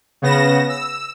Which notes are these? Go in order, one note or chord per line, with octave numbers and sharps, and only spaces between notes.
C#3 B3 A#6 E7
E6